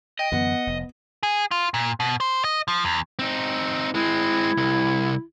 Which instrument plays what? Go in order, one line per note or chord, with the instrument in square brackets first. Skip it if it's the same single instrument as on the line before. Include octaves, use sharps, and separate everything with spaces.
[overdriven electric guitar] D#5 [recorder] G5
[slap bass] F#2 D3 E3 [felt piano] B3 [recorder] F#5
[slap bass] F1
[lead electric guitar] G#4
F4
A#2
B2
C5
D#5
F3
E2
C4 D#4
[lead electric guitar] G#3 C4 [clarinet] E4
[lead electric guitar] C2